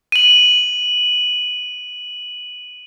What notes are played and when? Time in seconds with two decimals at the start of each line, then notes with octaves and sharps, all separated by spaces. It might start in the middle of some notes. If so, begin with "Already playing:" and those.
0.12 D#7 F#7